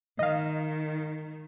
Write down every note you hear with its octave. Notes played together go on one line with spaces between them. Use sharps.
D#3 D#5 F5